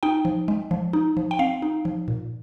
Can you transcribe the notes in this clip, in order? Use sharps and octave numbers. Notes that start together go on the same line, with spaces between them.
D#4 G5
F3
G#3
F3
D#4
F3
G5
C4 F5
D#4
F3
A#2